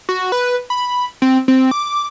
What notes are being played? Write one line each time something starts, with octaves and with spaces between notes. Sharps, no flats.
F#4
B4
B5
C4
C4
D6